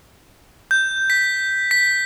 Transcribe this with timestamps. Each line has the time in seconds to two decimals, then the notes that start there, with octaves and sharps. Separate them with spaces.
0.71 G6
1.10 B6
1.71 B6